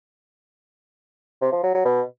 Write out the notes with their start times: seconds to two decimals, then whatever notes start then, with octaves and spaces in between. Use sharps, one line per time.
1.42 C3
1.53 F3
1.63 F#3
1.74 F#3
1.85 B2